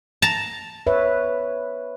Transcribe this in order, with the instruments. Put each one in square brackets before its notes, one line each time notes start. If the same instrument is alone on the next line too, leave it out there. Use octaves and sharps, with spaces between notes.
[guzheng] A5 A#5
[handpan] B4 C#5 E5